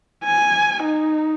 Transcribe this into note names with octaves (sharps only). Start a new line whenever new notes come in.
G#5
D#4